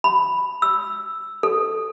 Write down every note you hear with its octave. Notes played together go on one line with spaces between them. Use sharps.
B5
E6
A4